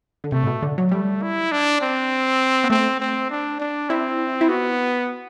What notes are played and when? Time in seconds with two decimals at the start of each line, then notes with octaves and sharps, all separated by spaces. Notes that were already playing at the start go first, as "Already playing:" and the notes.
0.24 D3
0.32 C3 A3
0.43 A2
0.47 B2
0.62 D3
0.78 F#3
0.91 G3 A3
1.22 E4
1.52 D4
1.81 C4
2.64 B3
2.70 A3 C4
3.00 C4
3.30 D4
3.60 D4
3.90 C4 E4
4.41 E4
4.48 B3 F#4